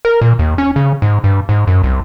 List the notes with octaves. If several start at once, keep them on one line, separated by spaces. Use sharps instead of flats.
A#4
A#2
D#2
C#4
C#3
G#2
G2
G#2
F#2
C2